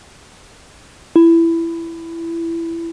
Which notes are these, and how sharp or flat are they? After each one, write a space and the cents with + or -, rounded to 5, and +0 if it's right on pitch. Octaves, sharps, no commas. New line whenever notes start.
E4 +15